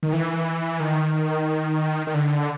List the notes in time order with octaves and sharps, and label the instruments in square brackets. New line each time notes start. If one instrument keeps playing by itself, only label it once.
[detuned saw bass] D#3
E3
D#3
D#3
D3